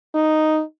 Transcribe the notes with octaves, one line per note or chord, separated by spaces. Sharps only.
D#4